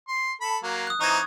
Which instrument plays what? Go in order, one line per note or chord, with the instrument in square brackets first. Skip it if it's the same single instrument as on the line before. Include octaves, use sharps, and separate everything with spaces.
[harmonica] C6
A4 B5
F#3 A#3
[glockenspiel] D#6 F#6
[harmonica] E3 C4 D#4 [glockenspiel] C#6 G#6